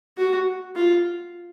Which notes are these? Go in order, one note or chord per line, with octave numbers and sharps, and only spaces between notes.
F#4
F4